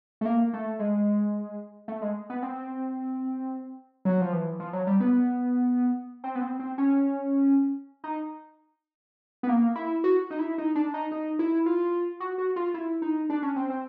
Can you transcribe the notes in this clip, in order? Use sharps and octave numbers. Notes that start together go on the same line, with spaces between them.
A3
A#3
A3
G#3
A3
G#3
B3
C4
F#3
F3
E3
F3
F#3
G3
B3
C4
B3
C4
C4
C#4
D#4
B3
A#3
E4
F#4
D#4
E4
D#4
D4
D#4
D#4
E4
F4
F#4
F#4
F4
E4
D#4
D4
C#4
C4
C4